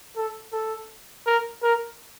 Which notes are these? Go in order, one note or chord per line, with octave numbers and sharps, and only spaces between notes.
A4
A4
A#4
A#4